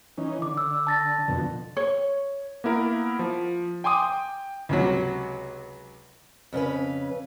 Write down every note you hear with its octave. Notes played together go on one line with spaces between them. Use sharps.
E3 C#4 D#4
D3 D6
E6
A5 A6 A#6
F2 B2 D3
C#5
A#3 B3 E4 A#4
F3
G5 G#5 C6 D6 D#6
G5
C#2 C3 F#3
F2 C#3 C#4 B4